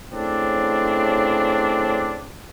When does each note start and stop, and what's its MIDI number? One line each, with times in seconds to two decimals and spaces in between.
0.13 2.29 45
0.13 2.29 49
0.13 2.29 60
0.13 2.29 62